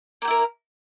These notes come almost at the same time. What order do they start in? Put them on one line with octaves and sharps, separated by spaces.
A#3 G4 E4 A#4